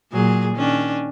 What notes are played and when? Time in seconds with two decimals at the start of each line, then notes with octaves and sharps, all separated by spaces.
0.13 A#2 F#3 G#4
0.55 D#3 C#4 D4